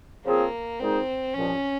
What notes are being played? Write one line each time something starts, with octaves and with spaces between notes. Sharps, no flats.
C#3 F3 A#3 C4 F4 G#4
A#2 G#3 C4 D#4 G#4
C2 A#2 F3 C#4